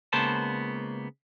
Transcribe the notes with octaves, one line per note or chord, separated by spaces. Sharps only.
C#2 C#3 A#3 B3 C5 A5